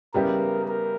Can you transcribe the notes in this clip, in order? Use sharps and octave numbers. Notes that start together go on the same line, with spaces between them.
C#3 G3 B3 E4 G4 A#4
A#4